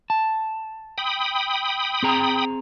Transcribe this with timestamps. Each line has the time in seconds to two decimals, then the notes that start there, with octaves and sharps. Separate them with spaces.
0.10 A5
0.98 G5 B5 D#6
2.03 C4 G#4 A#5